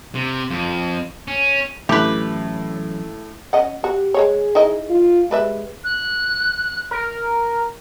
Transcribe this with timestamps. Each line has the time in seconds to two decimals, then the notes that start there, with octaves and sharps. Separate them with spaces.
0.15 C3
0.50 F2
1.28 C#4
1.89 A2 E3 F#3 C#4 G4 B4
3.53 C#4 D#5 F#5
3.84 F#4 G4
4.14 G#3 A#3 G#4 C#5
4.55 D#4 E4 D#5
4.90 F4
5.31 G3 G#3 B4 E5
5.84 F#6
6.91 A#4